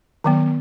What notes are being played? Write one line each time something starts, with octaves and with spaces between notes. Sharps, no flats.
D#3 F#3 B3